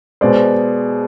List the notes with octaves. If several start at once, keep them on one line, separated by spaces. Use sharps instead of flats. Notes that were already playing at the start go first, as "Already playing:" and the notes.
B2 G#3 C5 D5